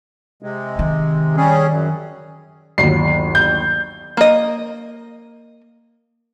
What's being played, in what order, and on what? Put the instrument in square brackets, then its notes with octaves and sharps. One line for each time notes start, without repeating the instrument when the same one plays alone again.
[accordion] C3 G#3
[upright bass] D#3
[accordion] G3 C#4 G#4
F#2
[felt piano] G1 D#2 F#3 [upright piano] C7
[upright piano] G6
[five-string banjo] A#3 D#5